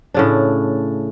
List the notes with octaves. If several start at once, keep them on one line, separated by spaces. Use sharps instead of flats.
A2 C#3 D4